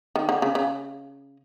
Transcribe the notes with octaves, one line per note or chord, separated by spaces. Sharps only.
D#3
D3
C#3
C#3